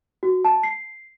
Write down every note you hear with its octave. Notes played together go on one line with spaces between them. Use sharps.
F#4
A5
C7